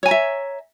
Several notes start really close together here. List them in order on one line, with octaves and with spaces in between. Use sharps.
C#5 G#5 A#5 E5